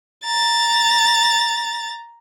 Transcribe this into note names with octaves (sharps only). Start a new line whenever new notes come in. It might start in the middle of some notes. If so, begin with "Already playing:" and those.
A#5 A6